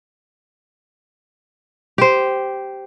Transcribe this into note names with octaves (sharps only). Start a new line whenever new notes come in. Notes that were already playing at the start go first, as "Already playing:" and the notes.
G4 C5